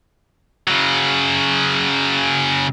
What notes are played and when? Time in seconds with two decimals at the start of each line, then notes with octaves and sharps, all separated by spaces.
0.67 C#3 F#3